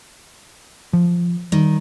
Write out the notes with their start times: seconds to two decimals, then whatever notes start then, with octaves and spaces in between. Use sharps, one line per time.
0.93 F3
1.52 D#3 G3